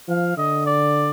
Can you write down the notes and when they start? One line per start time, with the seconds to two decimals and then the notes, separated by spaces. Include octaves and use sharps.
0.08 F3 F5
0.37 D3 D#5
0.66 D5